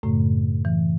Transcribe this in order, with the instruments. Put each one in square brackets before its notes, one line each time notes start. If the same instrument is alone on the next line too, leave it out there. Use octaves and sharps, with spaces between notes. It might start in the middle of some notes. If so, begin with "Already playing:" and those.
[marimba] F#2 A2 C#3 A3
E3